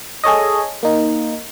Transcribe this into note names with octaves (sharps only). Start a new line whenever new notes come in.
G#4 A4 C#5 D#5
A#3 D#4